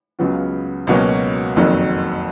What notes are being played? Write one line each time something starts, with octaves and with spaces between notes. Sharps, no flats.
C#2 C#3 F#3 B3 F4
C#2 B2 F#3 A#3 C#4
F#1 F2 D#3 F#3